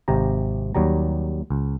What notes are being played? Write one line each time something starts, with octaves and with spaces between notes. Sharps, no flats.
G#1 C3 G4 A#5
D#2 F#3 G3 A#5
C#2